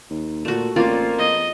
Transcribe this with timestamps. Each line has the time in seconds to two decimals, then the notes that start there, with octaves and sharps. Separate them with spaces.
0.10 D#2
0.45 A#2 A3 F#4
0.76 A1 A#3 C4 F4 D5
1.18 E2 D#5